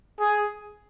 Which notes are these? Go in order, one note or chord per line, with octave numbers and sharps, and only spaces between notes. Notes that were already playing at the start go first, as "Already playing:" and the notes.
G#4